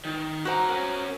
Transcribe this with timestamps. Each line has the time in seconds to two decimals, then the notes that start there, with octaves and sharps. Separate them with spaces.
0.05 D#3
0.45 F#4 A#4 C5 F#5 A#5
0.70 C#4 A#4